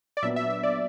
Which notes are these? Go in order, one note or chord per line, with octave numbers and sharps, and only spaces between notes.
D5
A#2 F#3 B3 D4 E5
E5
E5
D5